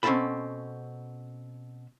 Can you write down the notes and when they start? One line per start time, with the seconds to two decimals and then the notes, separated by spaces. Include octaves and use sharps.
0.03 B2 C4 C#4 E4 A4 B5